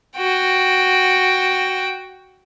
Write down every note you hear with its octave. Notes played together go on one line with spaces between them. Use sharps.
F#4 G5